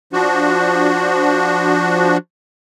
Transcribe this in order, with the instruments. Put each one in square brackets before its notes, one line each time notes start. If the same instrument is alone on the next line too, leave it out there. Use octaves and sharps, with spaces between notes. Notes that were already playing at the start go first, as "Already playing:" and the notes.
[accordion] F3 D4 F#4